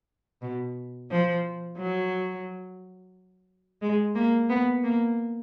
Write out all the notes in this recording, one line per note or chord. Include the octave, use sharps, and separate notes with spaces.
B2
F3
F#3
G#3
A#3
B3
A#3